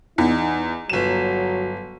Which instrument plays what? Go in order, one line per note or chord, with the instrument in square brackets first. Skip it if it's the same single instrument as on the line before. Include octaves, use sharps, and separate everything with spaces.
[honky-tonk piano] E2 [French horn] D#4
[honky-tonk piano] G1 E7 [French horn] F#3